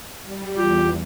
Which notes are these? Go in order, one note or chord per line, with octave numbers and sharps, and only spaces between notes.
G3
E2 F4 G4